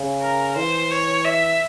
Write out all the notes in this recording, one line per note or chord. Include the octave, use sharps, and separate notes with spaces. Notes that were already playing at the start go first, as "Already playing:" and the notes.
Already playing: C#3
A#4
E3 C5
C#5
E5